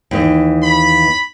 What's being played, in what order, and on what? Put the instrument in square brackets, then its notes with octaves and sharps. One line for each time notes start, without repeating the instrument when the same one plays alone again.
[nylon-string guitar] D#2 E3 D#5
[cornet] B5